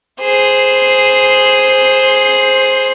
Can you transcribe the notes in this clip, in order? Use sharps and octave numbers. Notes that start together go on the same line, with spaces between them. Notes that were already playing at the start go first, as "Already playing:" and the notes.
G#4 C5